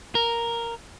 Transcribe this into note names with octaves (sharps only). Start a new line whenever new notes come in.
A#4